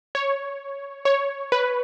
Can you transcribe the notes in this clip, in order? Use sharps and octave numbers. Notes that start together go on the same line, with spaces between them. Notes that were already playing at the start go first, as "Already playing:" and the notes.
C#5
C#5
B4